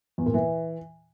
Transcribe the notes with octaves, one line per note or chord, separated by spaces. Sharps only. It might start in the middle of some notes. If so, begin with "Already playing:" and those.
E2
A#2
E3